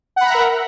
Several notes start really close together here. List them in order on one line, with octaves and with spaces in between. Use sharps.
F#5 B5 A#5 E5 A#4